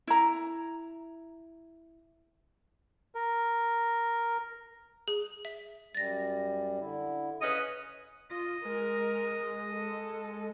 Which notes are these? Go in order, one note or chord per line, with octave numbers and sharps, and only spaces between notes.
E4 A#5
A#4
G#4
E5
F#2 G3 A6 A#6
D3 E4
C#3 C#4 G#4 B4 D#5
F4 D#5
G#3 A#4
A4